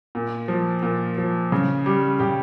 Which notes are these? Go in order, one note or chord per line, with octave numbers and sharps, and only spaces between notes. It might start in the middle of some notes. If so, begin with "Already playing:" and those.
A#2
F3
A#2
F3
C#3
G3
C#3 G4